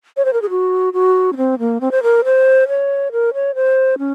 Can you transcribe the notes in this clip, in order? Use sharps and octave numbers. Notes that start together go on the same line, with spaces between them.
C#5
C5
A#4
G#4
F#4
F#4
C#4
C4
A#3
C4
C5
A#4
C5
C#5
A#4
C#5
C5
C#4